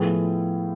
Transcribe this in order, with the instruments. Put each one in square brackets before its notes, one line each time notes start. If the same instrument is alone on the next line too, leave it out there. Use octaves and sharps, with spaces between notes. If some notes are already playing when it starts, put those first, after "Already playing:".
Already playing: [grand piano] A2 F3 B3 E4 G#4